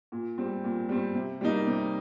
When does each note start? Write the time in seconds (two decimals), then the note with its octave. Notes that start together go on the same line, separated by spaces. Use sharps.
0.12 A#2
0.38 G3 C4
0.64 A#2
0.89 G3 C4
1.15 C3
1.41 G3 A#3 D#4
1.66 C3